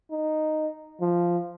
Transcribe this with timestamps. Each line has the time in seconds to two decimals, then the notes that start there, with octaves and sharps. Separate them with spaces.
0.11 D#4
1.01 F3